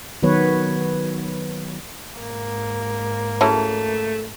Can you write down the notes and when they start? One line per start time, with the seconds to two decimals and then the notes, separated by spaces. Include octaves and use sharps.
0.23 D#3 F#3 B3 B4 C#5
2.15 G#2 A#3
3.41 F#3 A3 C#4 E4 G#4 A5